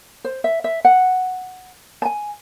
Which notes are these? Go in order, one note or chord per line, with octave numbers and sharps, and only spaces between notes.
C5
E5
E5
F#5
A5
G#5